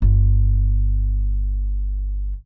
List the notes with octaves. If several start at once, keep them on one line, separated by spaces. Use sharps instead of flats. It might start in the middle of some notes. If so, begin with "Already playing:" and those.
G1 F4